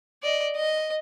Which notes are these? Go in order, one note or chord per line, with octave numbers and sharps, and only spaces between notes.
D5 D#5
D#5